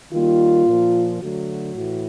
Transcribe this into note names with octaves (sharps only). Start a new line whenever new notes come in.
D#3 G3 A#3 F4
A#2 F3 A#3
D3 F#3 A3 F#4
A2 E3